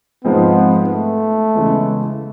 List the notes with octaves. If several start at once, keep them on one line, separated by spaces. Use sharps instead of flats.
G#2 F3 G#3 B3 C4
A3
C#3 E3 G#3 B3